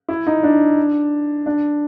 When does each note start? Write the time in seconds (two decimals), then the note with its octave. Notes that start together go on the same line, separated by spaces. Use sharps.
0.08 E4
0.26 D#4
0.43 D4
1.46 D4